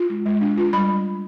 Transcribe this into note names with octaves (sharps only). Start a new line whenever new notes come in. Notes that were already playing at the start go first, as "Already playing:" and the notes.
Already playing: F4
G#3
G#3
D4
F4
G3 B5